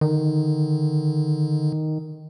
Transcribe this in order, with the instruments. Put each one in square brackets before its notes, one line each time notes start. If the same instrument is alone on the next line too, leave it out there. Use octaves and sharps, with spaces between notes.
[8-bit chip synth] D3 [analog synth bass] D#3